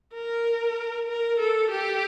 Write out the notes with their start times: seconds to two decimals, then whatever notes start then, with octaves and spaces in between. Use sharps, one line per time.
0.15 A#4
1.08 A#4
1.40 A4
1.71 G4